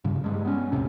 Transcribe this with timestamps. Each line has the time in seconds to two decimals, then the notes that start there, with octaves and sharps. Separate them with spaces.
0.04 G2 C#3
0.24 G2 G#3
0.45 B3 C#4
0.72 E1 A1 A2 C3